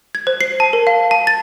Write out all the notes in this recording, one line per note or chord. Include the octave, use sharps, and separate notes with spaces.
G#6
C5
C7
A5
A#4
F5
A5
A6